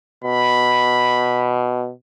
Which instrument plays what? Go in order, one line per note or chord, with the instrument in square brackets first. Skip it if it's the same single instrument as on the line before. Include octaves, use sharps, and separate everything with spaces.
[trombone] B2 [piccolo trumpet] B5